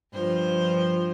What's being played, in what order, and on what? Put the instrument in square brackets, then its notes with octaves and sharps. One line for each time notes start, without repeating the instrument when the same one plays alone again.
[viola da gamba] G2 F3 C5